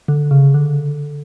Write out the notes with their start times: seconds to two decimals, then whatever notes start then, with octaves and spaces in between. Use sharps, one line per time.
0.08 D3
0.31 C#3
0.54 D3